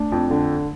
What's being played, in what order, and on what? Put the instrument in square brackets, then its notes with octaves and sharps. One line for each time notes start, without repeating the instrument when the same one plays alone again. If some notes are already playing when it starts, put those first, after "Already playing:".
Already playing: [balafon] A3 [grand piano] D4
[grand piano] F2
D3